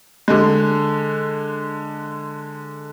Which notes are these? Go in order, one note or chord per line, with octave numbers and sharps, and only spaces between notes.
D3 G#3